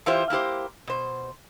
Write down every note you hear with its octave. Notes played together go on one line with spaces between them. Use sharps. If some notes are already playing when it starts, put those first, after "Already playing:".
E3 E4 F4 G4 C5
A#3 E4 G4 C5
B2 C5